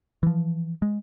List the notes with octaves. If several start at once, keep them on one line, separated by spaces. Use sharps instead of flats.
E3 F3
G#3